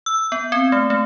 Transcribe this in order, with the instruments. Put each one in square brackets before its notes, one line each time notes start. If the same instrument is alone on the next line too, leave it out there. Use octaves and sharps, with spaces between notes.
[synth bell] E6
B3
C4
A3
A3